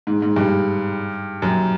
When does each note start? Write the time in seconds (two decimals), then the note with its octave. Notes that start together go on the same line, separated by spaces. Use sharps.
0.07 G#2
0.22 G#2
0.36 G2
1.42 F#2